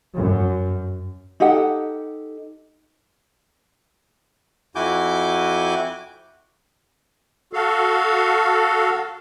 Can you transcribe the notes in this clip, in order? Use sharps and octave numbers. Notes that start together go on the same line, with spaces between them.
F#2
D#4 G4 A4 F#5
F2 E4 F#4 G#5 D6 G6
F#4 A4 F5